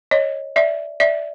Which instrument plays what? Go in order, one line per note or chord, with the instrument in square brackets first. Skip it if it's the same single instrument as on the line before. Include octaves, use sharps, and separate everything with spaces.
[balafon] C#5 D#5
D5 E5
D5 E5